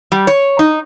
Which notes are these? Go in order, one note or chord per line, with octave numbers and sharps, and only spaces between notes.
G3
C#5
D#4